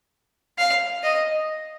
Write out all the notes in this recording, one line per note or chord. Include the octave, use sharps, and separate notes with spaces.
F5
D#5